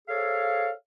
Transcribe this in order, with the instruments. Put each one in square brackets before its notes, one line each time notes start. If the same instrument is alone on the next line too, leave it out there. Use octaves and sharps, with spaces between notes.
[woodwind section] G#4 A4 C5 C#5 E5 F5